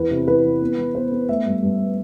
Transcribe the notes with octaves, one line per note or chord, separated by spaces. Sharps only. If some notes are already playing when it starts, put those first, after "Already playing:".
Already playing: E2 B4
C3
E3 B4
E3
B3
E3
B3 C5
B3
A3 E5
G2
G2
A3